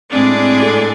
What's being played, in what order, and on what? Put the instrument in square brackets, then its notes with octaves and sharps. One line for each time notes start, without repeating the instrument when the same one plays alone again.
[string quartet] A2 G#3 D4 G#4 D5 [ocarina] C4
[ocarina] C4
A4